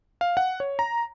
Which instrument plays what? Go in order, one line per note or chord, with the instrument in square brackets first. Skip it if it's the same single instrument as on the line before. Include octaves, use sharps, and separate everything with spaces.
[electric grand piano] F5
F#5
C#5
A#5